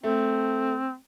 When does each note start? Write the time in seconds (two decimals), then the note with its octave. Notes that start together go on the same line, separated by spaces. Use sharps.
0.04 A3 C4